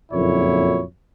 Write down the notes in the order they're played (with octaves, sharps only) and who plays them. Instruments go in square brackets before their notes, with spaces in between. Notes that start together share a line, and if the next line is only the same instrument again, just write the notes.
[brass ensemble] F#1 F2 A#2 F#3 E4 C#5